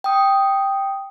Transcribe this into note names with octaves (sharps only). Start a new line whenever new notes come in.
G5 D#6